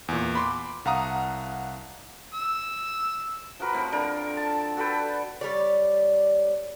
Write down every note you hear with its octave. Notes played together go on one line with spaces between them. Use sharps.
E2 A#2
B5 C6 D6
C2 F5 F#5 A#5 D#6
E6
F3 F#4 A#4 B4
A2 C4
D3 A#4
A5
F#4 A4 B4 G5
G3 C#5 D5